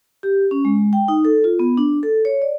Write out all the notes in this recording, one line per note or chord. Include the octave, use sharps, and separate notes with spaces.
G4
C#4
G#3
G5
D#4
A4
F4
B3
D4
A4
C#5
D5